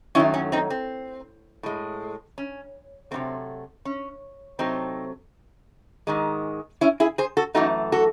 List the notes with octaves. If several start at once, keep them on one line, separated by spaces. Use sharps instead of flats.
F#2 D#3 F#3 A3 C#4 E4
C#4
C4 D#4
C4
A2 G#3
C#4
C3 D#3 F#3 A3 C4
C#4
C3 F#3 A3 C4 D#4
G#2 D#3 G#3
C#4 E4
E4 G#4
G#4 C5
F#4 A4
F#2 E3 A3 D#4 F#4
F#4 A4